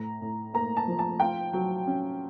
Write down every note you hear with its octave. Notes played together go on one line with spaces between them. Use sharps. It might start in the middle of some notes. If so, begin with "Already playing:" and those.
Already playing: A2 A#5
A2
A#3 A#5
A5
F3
A5
F4 G5
F#3
C#4